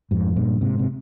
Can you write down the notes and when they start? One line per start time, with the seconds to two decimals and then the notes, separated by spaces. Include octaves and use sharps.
0.11 F2 G#2
0.36 G2 A#2
0.61 G#2 C3
0.79 C3